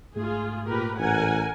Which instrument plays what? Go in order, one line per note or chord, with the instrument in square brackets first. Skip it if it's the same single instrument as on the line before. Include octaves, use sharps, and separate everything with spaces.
[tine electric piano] G#2 A3 [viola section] F4 G#4
[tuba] A#2 [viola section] G4 A#4 B4
[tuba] A1 [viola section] A#4 F#5 G#5